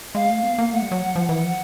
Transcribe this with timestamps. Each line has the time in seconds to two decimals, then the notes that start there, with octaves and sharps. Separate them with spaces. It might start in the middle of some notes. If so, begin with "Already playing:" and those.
0.15 G#3 F5
0.30 A3
0.43 B3
0.58 A#3
0.73 A3 F#5
0.82 G3
0.92 F#3
1.16 F3
1.29 E3 F#5
1.44 F3